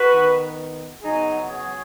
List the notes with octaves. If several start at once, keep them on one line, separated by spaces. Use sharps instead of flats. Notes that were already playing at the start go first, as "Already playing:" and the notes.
Already playing: F#4 B4
D#3 B3
C#3 F#3 B3 D#4 G#4
G#4 C#5